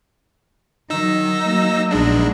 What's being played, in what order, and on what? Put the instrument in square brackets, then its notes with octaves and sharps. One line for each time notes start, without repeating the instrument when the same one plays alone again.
[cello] D#3 F#3 [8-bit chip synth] D#4 E6 A#6
[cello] F#3 A#3
[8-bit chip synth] A#1 G#3 D4 [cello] B3 D#4